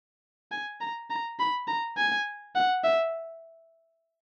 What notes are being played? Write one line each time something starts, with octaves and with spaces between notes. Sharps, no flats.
G#5
A#5
A#5
B5
A#5
G#5
F#5
E5